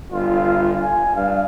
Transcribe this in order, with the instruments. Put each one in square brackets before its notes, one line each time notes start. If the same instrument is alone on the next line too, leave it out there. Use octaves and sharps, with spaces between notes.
[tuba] G1 [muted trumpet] F4
[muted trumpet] G#5
[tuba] G2 [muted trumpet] F5